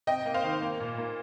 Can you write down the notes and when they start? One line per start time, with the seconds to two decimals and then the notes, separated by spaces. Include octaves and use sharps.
0.07 C3 D#5 G5
0.26 A#3
0.34 C5 F5
0.44 D#3
0.61 A#3
0.80 A#2
0.98 A#3